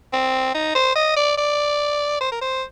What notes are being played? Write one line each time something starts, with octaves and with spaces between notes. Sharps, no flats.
C4
D#4
C5
D#5
D5
D5
C5
A#4
C5